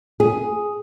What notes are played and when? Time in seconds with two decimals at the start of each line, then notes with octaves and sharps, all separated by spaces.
0.20 G#4